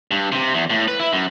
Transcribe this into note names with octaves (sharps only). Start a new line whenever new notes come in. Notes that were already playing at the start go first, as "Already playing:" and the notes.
G2
C3
E2
A2
B4
E4
F#2